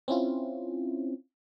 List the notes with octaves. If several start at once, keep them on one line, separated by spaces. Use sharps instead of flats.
C4 C#4 E4 F4